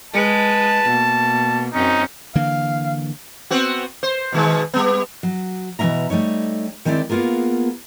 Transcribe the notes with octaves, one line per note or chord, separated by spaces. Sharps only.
G#3 B4 A5
B2 A#3
F#2 C4 C#4 D#4
D3 E3 A#3 F5
B3 C4 F#4
C5
B2 D#3 G#3
G3 B3
F#3
B2 E3 A#3 C#4 E5 A#5
G3 A3 D#4 C#5
D#3 G#3 C4 E4 D5
A#3 B3 F4 G#4 A#4